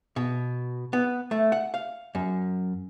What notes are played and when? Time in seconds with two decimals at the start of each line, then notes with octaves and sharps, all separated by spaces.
0.16 B2
0.93 B3
1.31 A3
1.52 F#5
1.74 F5
2.15 F#2